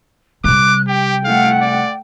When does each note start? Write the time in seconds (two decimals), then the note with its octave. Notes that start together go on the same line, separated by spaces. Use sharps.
0.44 C3 G3 D6 F#6
0.88 G4 G5
1.24 A3 F5 F#5
1.61 D5